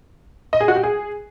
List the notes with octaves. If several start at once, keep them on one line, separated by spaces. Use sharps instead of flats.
D#5
G#4
F#4
G4
G#4